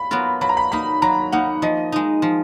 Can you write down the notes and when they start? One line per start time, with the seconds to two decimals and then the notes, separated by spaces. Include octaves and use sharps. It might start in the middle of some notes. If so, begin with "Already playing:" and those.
Already playing: B5
0.11 F#3 B3 F4 A#4
0.41 F#3 B5
0.49 A#5
0.57 B5
0.72 A#3 D#4 B5
1.02 F#3 A#5
1.32 A#3 D#4 F#5
1.62 F3 D#5
1.92 G#3 D#4
2.22 F3